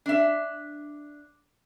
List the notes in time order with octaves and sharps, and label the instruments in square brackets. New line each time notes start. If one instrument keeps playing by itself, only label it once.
[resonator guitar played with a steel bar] D4 E5